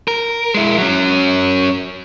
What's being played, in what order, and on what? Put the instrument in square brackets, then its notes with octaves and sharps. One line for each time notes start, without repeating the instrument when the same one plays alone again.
[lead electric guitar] A#4
G#3 E4
F#3 C#4